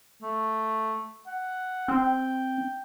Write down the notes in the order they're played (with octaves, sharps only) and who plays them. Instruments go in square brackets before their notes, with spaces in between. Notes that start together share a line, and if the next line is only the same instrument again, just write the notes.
[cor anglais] A3
F#5
[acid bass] C4 [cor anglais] G5